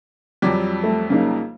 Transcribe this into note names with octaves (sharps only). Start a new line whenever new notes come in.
F2 F#3 G3 D6
A3
C#3 A#3 D#4